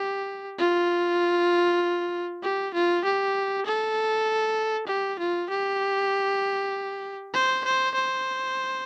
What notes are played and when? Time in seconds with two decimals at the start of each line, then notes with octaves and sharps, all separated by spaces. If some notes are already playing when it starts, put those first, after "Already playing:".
Already playing: G4
0.59 F4
2.43 G4
2.74 F4
3.05 G4
3.66 A4
4.87 G4
5.19 F4
5.50 G4
7.34 C5
7.64 C5
7.95 C5